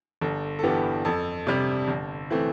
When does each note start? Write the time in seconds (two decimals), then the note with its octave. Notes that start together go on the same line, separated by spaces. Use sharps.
0.21 G1 A4
0.59 A4
0.63 G2 E3 B3 G4
1.05 F2 A4
1.47 C3 G3 D4
1.88 G1
2.30 E3 A3 C4